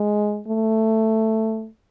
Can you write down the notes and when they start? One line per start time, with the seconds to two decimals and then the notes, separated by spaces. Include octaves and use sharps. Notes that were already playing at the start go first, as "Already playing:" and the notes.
Already playing: G#3
0.47 A3